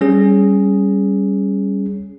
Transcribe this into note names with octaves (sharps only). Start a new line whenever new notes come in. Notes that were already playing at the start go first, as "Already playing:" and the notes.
G3 C#4 G#4